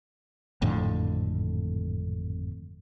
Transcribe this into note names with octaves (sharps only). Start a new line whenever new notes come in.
G#1 F2 A2 D3